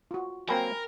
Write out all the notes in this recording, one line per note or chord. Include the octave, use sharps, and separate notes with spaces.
F4 F#4
F#3 A#3 C4 A#4 G5 G#5 B5